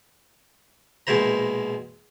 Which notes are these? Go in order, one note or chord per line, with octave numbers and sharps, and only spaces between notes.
A#1 B2 G#3 E4 C5 A#5